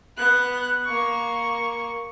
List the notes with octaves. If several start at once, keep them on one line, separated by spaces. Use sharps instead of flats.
B3 F#6
A#3 C#6